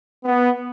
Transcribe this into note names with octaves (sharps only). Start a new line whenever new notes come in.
B3